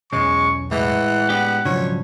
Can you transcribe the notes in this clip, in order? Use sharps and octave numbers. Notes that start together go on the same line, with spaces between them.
B1 E2 G#3 C#4 C#6
A2 E3 G#3 F#5
B3 D4 G4
B1 G#2 C#3 F3 F#3 D4 C#5